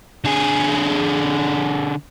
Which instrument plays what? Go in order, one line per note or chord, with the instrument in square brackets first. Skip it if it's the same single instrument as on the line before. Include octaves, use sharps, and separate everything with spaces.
[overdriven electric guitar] D3 G#4